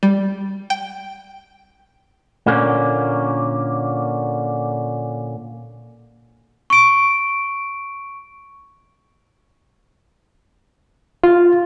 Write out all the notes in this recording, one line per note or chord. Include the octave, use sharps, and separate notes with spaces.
G3
G5
A#2 D3 A#3 C#4
C#6 D7
F4